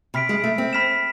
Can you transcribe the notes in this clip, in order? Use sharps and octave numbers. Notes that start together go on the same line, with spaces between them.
C3 B5 F6 B6 D7
G#3
A3
C4
B5 F6 B6 E7